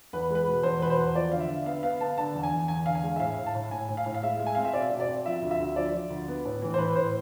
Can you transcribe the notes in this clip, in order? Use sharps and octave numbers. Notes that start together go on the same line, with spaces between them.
E2 B4
G#3 B4
B2
E2 C5
B2 B4
C5
E2
F3 D5
D3 F5
E5
D3
B3 F5
B3 F5
B3 A5
D3 A5
E2
G#5
E2
E2 G#5
D3 F5
G#5
G#3
E5
A2 F5
A2
A5
A2
A2 G#5
A2
F5
A2
F5
G#3 E5
G#3
G#5
C4 F5
E5
B2 D5
B2
D5
C4
F3 E5
D2
E5
D2
F3 D5
F3
D2
B3
A2
E3
C5
A2 B4
A2 C5